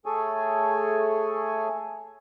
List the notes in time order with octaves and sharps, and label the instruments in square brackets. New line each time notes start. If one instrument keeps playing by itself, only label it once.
[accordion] A3 G#4 A4 C#5 G#5